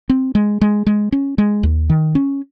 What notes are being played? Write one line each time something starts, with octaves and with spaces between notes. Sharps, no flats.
C4
G#3
G#3
G#3
C#4
G#3
D#2
D#3
C#4